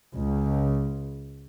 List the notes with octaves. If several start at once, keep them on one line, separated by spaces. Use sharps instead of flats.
C#2